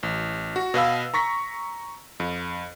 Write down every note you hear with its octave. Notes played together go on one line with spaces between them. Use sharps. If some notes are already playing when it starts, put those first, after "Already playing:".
A1
F#4
B2 B4 F5 E6
A#5 C#6 A#6 B6
F2